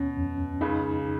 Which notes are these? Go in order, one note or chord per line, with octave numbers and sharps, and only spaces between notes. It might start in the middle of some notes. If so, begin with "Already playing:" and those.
Already playing: D#2 B2 C#4
F2
C#2 C#3 D#4